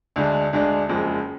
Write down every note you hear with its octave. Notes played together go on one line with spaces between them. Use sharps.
D2 D3 G#3 D4
D2 D3 G#3 D4
F#1 F2 F3 G#3